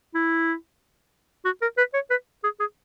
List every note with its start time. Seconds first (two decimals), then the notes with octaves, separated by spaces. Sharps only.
0.15 E4
1.45 F#4
1.62 A#4
1.78 B4
1.94 C#5
2.10 B4
2.44 G#4
2.60 G#4